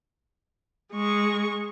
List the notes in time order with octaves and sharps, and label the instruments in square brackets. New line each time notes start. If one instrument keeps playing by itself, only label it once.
[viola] G#3 C#6